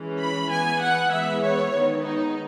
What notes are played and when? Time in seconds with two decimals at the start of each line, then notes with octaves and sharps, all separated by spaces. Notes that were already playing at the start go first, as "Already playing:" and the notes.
Already playing: E3 G#3 C#4
0.20 B5
0.51 E3 B3 G#5
0.82 F#5
1.12 E3 G#3 B3 E5
1.43 C#5
1.74 D#3 G#3 B3
2.04 D#4